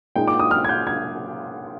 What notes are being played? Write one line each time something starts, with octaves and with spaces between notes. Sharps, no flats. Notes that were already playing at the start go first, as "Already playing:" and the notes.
A#2 G#3 D#4 G5
D6
D#6
F6
G#6
G6
G#6